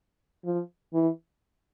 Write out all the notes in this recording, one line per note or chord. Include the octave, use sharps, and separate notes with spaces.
F3
E3